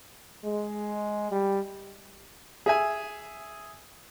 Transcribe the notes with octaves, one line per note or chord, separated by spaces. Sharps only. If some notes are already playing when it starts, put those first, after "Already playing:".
G#3
G3
G#4 E5 G#5